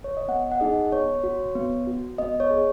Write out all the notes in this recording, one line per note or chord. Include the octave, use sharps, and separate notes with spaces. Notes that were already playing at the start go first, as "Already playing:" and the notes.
C#5
D#5
B3 F#5
F#5
D#4 G#4 D#5
B3 C#5
F#4
B3
F#4
B3 D#5
C#5
G#4